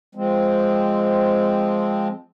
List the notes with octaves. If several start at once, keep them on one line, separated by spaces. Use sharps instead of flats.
F3 G#3 C4